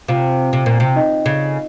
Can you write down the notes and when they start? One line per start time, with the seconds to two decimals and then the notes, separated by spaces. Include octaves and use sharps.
0.08 C3 F4 F5
0.53 C3
0.66 A#2
0.80 C3
0.96 D#4 D#5
1.26 C#3